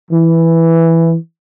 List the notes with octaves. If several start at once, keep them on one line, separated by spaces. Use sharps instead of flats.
E3